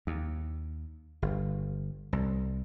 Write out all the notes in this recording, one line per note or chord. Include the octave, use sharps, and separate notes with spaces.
D#2
G1
C2